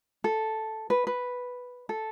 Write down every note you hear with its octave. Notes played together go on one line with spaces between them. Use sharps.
A4
B4
B4
A4